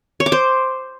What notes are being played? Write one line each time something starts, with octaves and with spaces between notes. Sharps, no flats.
C#5
D6
C5